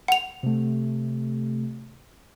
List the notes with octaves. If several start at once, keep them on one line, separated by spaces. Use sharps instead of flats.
F#5 F7
C3 A3